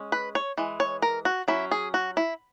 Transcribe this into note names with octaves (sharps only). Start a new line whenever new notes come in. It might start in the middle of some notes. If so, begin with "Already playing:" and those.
Already playing: G#3 C#4
B4
C#5
E3 G#3
C#5
A#4
F#4
F#3 C#4 E4
G#4
F#4
E4